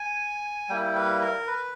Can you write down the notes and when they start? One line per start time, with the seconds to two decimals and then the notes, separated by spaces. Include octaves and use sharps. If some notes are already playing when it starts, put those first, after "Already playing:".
Already playing: G#5
0.69 G3 A#3 E4 G5
0.96 B4
1.21 A#4
1.47 B4